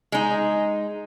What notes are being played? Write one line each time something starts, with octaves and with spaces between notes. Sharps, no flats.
G#3 D#4